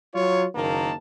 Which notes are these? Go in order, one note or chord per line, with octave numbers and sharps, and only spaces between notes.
F#3 F4 C#5
F#1 D#3 A#3 A5